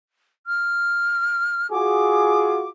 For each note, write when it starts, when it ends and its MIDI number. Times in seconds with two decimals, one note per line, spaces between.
0.47 1.70 89
1.71 2.67 65
1.71 2.67 66
1.71 2.67 68
1.71 2.68 86